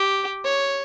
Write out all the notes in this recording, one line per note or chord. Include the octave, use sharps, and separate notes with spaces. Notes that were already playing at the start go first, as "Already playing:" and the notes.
Already playing: G4
C#5